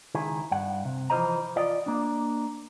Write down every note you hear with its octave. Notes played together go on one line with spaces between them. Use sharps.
C#2 D#3 E4 G#4
G2 F#5
C3
E3 F3 G#4 C5 D#5 A#5
F4 D5 D#5
A#3 D4